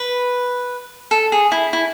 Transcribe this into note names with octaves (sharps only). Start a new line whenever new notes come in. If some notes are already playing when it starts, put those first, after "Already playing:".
Already playing: B4
A4
G#4
E4
E4